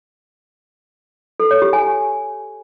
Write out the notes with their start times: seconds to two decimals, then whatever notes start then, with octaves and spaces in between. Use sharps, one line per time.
1.40 A4
1.51 C#5
1.62 G4
1.73 G#5